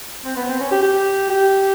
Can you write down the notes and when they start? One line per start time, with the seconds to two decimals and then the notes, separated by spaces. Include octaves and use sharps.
0.25 C4
0.36 B3
0.49 C4
0.60 C#4
0.71 G4
0.82 G4
1.30 G4